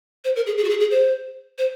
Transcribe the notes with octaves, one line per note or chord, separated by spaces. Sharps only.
C5
A#4
G#4
G#4
F#4
G#4
G#4
C5
C5